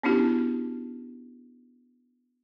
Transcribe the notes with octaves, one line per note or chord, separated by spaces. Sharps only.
B3 C#4 D4 E4 F#4 G4